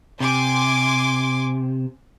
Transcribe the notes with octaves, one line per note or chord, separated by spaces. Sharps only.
C3 G#5 C6 D6